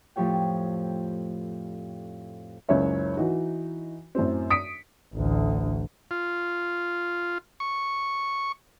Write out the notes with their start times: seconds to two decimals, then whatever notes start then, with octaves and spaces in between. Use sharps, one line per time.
0.16 F2 A2 F3 G4 C#5 G5
2.69 F#1 C#2 C#4 C#5 E5
3.17 E3 D#4 F#4
4.15 F#2 A2 F#3 C4
4.50 D#6 B6 C#7 D7
5.14 A1 D2
6.11 F4
7.60 C#6